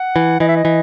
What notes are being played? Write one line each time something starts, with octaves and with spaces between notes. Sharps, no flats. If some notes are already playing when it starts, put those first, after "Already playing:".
Already playing: F#5
E3
E3 D#5
E5
D#5
E3